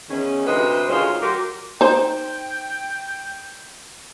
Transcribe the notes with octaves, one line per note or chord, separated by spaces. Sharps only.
E2 D#3 C#4
D2 C3 B4 C5 D#5
D2 D#3 G#3 C#4 F4 C5
F#3 F4 G4 A#4
D#4 C5 G5